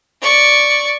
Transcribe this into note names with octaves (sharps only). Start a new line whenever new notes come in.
D5 C#6